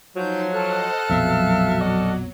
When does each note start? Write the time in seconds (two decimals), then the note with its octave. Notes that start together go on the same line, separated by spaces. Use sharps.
0.16 F3 F#3 D#4 C6 G6
0.51 A4 C5 D#5 F#5 F6 F#6
1.09 A#1 F2 B2 F#3 E5 F5
1.80 F#4 D5 D#5